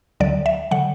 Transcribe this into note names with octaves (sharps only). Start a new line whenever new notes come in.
D2 D3 F#3 D5
E5
D3 F#3 F#5